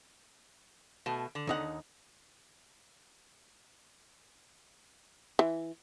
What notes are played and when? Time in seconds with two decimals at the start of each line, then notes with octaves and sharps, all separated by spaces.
1.06 B2 A3
1.35 D3
1.47 D#2 D#4 F#5
5.39 E3